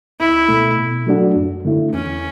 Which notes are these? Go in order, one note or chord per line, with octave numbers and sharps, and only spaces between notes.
C#2 E4
B2 A3
B2
F#3 A3 D4 F#4
F#2
D3 A3 E4
E2 C#4